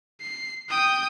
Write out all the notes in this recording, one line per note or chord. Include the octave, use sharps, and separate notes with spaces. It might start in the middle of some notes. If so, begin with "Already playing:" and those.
C7
G5 D#6